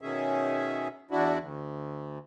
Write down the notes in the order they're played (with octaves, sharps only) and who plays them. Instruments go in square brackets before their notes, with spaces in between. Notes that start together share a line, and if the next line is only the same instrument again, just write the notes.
[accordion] B2 D#3 C#4 G#4 E5
E2 D4 E4 F#4
D2